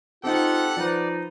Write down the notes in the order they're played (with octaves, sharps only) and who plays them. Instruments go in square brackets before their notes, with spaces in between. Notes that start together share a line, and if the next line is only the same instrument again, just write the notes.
[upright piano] C4 D#4 [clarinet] F4 [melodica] G4 A4 [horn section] F#5
[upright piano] F3 B4 [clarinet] D#4 [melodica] D5